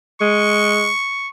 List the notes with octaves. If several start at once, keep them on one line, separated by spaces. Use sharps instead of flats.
G#3 C#6